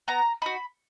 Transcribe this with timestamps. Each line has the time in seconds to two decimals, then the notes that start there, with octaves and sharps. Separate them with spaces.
0.08 B3 A#5
0.42 D#4 F#4 B5